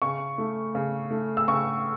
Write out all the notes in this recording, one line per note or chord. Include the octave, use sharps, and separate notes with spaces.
C#3 C#6
A3
C#3
A3
E6
C#3 C#6